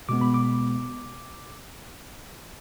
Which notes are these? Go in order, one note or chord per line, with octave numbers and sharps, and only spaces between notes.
B2 G#3 B3 D6
B5
D6